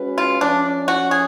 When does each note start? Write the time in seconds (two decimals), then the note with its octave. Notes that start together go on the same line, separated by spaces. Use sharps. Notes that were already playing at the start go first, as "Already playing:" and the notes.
Already playing: G#3 C#4 F#4 B4
0.18 F4
0.41 F3 A3 C#4 D4
0.88 F#4
1.11 G#4